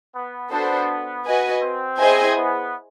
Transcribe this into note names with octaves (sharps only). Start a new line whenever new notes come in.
B3
B3 D4 F#4 A4 C5
F#4 B4 D#5 G#5
C4
E4 G#4 C5 D#5 G#5
B3